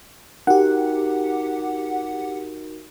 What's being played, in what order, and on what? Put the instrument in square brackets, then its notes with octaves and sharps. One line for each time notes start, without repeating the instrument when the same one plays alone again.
[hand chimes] D#4 F#4 A#4 [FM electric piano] G4 F#5